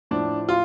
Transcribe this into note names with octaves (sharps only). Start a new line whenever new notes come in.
A2 F3 D4
F4